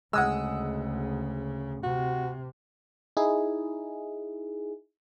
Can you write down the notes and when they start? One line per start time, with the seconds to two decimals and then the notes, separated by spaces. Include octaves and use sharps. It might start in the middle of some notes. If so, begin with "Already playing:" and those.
0.13 D2 C#3 G#3 F#5 D#6 E6
1.84 C3 F#4
3.17 D#4 E4 G#4